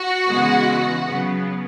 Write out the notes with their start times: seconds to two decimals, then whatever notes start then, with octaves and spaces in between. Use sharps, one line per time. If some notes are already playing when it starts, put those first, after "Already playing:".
Already playing: F#4 F#5
0.28 C#3 E3 G#3 B3
1.06 C#3 F#3 B3